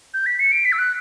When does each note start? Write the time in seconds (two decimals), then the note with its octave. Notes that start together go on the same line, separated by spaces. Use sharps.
0.14 G6
0.26 B6
0.40 C#7
0.52 D7
0.65 B6
0.72 E6
0.78 F#6